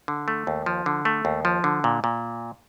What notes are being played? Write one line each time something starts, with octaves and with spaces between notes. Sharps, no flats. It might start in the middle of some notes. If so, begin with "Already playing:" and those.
D3
A3
D#2
F3
D3
A3
D#2
F3
D3
A#2
A#2